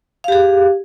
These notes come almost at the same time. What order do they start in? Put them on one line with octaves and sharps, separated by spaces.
F5 G4 G#4